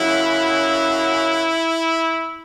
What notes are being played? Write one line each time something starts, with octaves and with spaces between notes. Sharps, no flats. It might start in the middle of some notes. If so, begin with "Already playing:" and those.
Already playing: F#2 C#3 F#3 E4